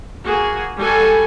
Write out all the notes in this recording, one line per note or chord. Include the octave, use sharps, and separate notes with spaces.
A#3 F#4 G#4
G3 F#4 A4 G#5